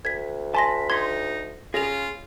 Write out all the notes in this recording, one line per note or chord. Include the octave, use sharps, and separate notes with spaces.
D2 G#6 B6
G#5 A5 B5 C6 A#6
D#4 C6 G#6 B6
C#3 F4 G#4 A#6 F7